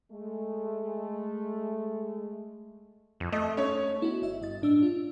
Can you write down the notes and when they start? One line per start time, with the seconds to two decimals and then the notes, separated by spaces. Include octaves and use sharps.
0.11 G#3 A3
3.20 F2
3.32 A3 D#5
3.57 C#4 C#5
4.00 B3 E4 F#4
4.22 G1 D#5 E5
4.41 G2 D#5 A6
4.62 A2 D4 E6
4.82 F4